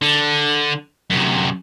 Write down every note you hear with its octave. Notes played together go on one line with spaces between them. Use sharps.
D3
F#2 C3